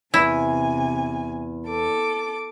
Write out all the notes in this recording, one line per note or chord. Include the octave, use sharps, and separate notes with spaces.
E2 C3 E4 G#5
A4 D6